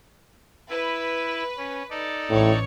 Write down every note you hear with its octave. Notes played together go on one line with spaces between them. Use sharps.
E4 B4
C#4
D#4 A4 D5
A1 A2 C#5